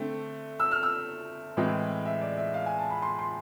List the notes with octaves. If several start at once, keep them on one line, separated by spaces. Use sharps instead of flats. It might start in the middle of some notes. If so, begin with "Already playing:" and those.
Already playing: D3 A3 C4
E6
F6
E6
A2 E3 G#3 C4
E5
D5
E5
F5
G#5
A5
B5
C6
C6